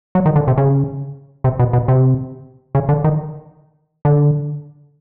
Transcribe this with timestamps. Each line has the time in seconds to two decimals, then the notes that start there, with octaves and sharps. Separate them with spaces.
0.15 F#3
0.26 D#3
0.36 D3
0.48 C3
0.58 C#3
1.44 C3
1.59 B2
1.73 B2
1.88 C3
2.75 C#3
2.89 D3
3.04 D#3
4.05 D3